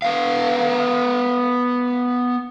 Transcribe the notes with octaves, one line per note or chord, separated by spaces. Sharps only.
B3 F5